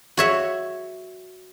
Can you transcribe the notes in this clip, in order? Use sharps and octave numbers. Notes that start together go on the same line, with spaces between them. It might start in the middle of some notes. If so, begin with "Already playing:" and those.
F#4 C#5 E5